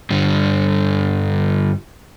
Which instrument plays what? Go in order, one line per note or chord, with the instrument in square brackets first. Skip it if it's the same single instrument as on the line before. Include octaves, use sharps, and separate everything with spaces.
[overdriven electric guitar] G2 D3